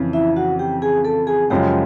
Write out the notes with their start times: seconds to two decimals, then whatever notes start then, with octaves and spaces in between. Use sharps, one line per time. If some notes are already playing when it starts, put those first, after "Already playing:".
Already playing: F2 C#3 E3
0.13 E4 E5
0.36 F#4 F#5
0.59 G4 G5
0.82 G#4 G#5
1.05 A4 A5
1.27 G#4 G#5
1.50 F#2 C#3 F3 G#3 G4 G5